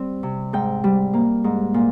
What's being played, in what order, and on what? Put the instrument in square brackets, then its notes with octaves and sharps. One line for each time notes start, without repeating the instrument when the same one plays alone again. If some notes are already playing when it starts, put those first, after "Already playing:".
Already playing: [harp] G3 C4
C3
G#2 G5
G3
A#3
G#2
A#2